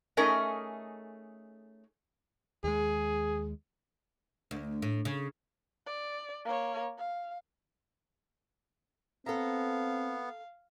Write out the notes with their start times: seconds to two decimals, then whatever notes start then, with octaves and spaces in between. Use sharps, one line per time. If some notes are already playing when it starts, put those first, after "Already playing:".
0.17 A3 C#4 D#4 G#4 A#4 D#5
2.64 D#2 G#3 G#4
4.51 D2
4.82 A2
5.05 C#3
5.86 D5
6.45 A#3 C#5
6.98 F5
9.26 B3 C4 A4 F5 A#5